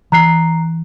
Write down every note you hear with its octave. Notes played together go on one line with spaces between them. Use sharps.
E3 A#5 F#6 C7